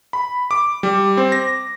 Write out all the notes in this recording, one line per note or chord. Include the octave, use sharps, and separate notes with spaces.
B5
D6
G3
C4
A#6